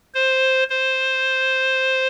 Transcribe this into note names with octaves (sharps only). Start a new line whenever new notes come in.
C5
C5